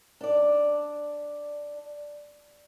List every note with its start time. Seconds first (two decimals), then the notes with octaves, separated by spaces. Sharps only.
0.21 D4 D5